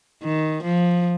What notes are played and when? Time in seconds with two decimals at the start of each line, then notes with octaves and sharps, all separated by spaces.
0.23 D#3
0.63 F3